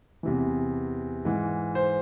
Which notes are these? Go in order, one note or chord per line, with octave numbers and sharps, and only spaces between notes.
E2 C3 E3
G#2 E3
C5